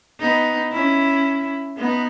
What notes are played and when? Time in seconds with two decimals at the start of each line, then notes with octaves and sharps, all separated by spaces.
0.20 B3 D#4
0.72 C#4 E4
1.78 B3 D#4